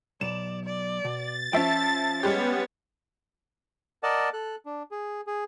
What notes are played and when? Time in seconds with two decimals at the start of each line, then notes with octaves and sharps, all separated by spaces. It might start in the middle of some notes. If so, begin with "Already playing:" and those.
0.21 B1 D5 E7
0.65 D5
1.05 B2 A6
1.53 F3 C#4 E5 G5 A5
2.23 G3 G#3 B3 G4 C#5
4.03 A#4 D5 D#5 F#5 A5
4.33 A4 F#6
4.66 D4
4.91 G#4
5.27 G#4